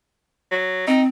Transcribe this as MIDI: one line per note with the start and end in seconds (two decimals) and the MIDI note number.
0.51 0.87 54
0.87 1.07 60
0.87 1.02 63